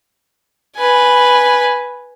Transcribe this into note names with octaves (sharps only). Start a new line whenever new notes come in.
B4 G#5